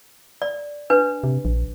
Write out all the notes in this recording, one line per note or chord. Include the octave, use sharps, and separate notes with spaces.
D5
D4 B4
C3
A#1